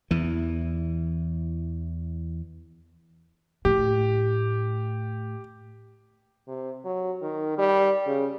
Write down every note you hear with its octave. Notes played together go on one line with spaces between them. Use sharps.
E2 E3
A2 G4
C3
F#3
D#3
G3
C#3